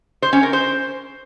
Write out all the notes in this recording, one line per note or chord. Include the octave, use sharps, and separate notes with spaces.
C5
C#4
A#4
C5